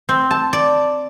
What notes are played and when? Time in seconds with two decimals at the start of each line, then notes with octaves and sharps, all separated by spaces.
0.09 C4
0.31 A5
0.53 D5